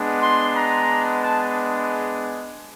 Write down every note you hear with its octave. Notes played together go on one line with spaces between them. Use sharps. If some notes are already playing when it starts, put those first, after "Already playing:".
Already playing: G#3 B3 D4
C6
A#5
A5